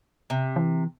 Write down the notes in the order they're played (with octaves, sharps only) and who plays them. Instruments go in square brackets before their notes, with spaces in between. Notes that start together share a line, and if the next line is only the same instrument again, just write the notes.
[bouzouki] C3
[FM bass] E3